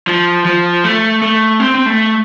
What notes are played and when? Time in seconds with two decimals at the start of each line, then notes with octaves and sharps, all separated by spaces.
0.07 F3
0.45 F3
0.84 A3
1.22 A3
1.60 C4
1.75 C4
1.86 A3